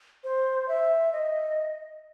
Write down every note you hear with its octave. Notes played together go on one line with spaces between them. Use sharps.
C5
E5
D#5